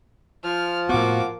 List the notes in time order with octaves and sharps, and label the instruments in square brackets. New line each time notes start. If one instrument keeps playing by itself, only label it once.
[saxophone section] F3 [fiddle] F6
[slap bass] A2 B3 [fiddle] A#3 D6 [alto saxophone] F#4